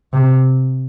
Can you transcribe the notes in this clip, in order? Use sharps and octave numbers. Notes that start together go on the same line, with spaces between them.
C3